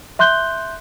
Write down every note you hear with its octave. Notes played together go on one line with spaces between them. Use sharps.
E5 C6 F#6 G6 G7